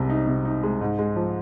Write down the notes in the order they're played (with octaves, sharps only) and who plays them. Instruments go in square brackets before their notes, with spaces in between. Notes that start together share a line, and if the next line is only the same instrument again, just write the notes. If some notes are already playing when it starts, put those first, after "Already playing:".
Already playing: [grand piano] C2 C3 G#3
D#4
C3
D#4
G#3
G#2
G#3
F3